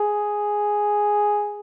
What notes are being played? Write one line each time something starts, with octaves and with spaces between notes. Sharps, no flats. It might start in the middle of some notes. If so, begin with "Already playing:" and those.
Already playing: G#4